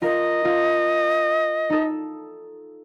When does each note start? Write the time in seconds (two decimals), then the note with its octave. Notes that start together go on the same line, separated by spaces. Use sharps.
0.02 F4 A#4 D#5
0.45 F4
1.70 D#4 A4